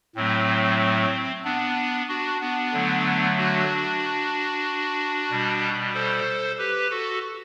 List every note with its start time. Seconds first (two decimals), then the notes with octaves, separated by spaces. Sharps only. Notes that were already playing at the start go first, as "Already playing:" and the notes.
0.15 A2 F#3 A3 C4
1.44 B3 D4
2.08 D4 F#4
2.41 B3 D4
2.73 D3 F#3 A3
3.38 D4 F#4
5.30 B2 G3
5.94 A4 C5
6.58 G4 B4
6.90 F#4 A4